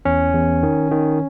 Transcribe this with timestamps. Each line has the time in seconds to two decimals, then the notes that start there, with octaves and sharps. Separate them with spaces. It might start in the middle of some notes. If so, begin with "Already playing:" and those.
0.05 E2 C#4
0.34 E2
0.63 D#3
0.91 D#3